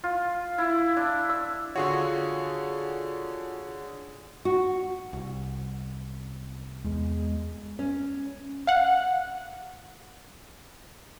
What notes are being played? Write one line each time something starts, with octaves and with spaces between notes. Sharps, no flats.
F4
E4
D4
E6
D3 F4 F#4 G#4 C#5
F#4
C2
E2 G#3
C#4
F5 F#5